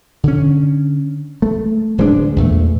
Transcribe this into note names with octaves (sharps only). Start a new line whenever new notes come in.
D3 C#4
A3
D1 G#3 B3 D4
E2 A#2 A3